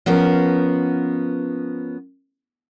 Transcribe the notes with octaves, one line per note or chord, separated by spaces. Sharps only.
F3 B3 C#4 A#4